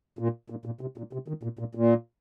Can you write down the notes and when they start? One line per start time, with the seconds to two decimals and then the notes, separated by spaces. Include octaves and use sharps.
0.19 A#2
0.50 A#2
0.65 A#2
0.81 C3
0.98 A#2
1.13 C3
1.28 D#3
1.43 A#2
1.59 A#2
1.75 A#2